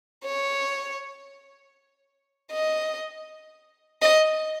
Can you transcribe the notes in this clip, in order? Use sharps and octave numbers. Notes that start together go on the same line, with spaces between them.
C#5
D#5
D#5